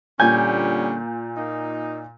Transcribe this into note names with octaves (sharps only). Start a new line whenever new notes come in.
A#2 D3 G3 C#4 G#5 G6
A#3 D#4